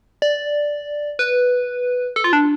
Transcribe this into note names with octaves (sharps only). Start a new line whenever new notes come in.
D5
B4
A4
F4
D4